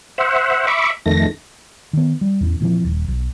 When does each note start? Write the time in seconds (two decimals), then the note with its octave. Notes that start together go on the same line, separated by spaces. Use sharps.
0.18 C5 E5 F#5
0.67 E5 B5 C#6 D6
1.06 F2 D#3 A3 A#6
1.93 D#3 B3
2.21 G3
2.41 A1 E2
2.60 A#2 E3 F3 C4
2.85 D#1
3.08 B1